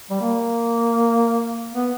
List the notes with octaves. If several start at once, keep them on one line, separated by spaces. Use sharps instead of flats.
G3
A#3
B3